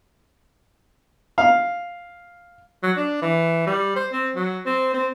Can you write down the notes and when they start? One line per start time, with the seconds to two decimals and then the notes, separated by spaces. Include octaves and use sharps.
1.38 F5
2.83 F#3
2.97 D4
3.22 E3
3.67 G3
3.96 C5
4.13 C4
4.36 F#3
4.66 C4
4.94 C4